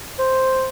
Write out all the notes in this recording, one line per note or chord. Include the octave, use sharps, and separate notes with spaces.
C5